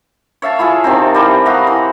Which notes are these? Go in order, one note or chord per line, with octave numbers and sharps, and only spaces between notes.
C#5 E5 F5 A5
E4 F4 G#4 A4
C3 D#3 C4
E3 G3
F#4 D#5 F5 A#5
E3